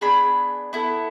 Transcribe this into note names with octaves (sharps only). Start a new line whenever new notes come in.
B3 D4 G#4 B5
B3 E4 A4